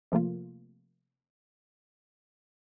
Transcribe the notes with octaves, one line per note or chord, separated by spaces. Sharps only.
C3 F3 A3 A#3 F4